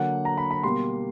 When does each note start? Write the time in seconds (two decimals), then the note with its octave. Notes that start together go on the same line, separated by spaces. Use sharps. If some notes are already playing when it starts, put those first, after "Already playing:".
Already playing: D3 F#3 A#3 F#5
0.25 A#5
0.38 B5
0.51 B5
0.63 B2 G3 A#3 C6